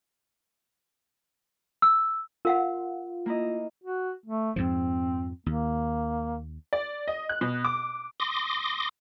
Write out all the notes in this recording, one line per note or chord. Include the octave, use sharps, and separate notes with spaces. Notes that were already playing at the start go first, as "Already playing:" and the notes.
E6
F4 A#4 F5 F#5
A#3 E4 D#5
F#4
A3
F2 G#2 F3 C4
D#2 A#3
D5
D#5
F#6
B2
D6
C6 D6 D#6 A#6